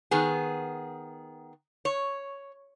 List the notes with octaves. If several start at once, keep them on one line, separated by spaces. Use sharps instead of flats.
D#3 B3 G#4
C#5